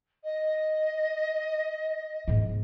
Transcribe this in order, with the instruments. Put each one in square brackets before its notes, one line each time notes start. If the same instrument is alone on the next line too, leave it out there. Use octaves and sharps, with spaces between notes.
[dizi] D#5
[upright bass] G#2 B3